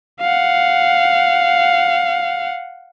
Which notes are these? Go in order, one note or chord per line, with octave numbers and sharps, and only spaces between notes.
F5 F#5